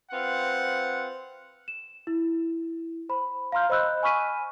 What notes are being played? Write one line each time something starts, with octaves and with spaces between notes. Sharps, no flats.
C4 F4 B4 F#5
E7
E4
C5 B5
F5 A#5 C6 F6 G6
C5 D#5 B5 E6 F#6 G6
G#5 B5 C#6 F6 B6 D#7